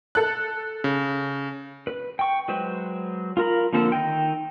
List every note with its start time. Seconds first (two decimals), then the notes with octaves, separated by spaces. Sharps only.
0.15 A4 F#6
0.84 C#3
1.87 B4
2.19 G5 C#6
2.48 F#3 G#3 B4 C5
3.37 F4 A#4 A#5 B5
3.73 D3 F3 A#3 C4 A4
3.92 D#3 D#4 G5